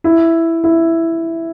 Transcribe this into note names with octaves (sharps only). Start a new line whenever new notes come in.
E4
E4